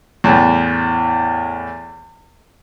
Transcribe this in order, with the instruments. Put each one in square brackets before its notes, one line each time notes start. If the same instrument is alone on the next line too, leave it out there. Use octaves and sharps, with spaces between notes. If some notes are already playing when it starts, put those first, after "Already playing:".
[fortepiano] E2 A2